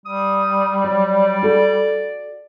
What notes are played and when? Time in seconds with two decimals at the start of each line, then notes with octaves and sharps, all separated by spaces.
0.06 G3 D#6
0.84 F#3 D5
1.43 F#4 A4